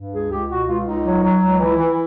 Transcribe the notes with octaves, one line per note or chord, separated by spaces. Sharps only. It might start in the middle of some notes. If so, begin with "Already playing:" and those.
Already playing: G2
C#2 G#4
C#2 G4
B2 F#4
C#2 F4
C#2 D#4
F#3
F#3
C#2
E3 E4
E3